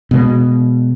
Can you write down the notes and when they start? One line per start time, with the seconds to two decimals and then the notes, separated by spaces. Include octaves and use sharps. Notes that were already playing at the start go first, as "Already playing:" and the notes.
0.11 B2 G#3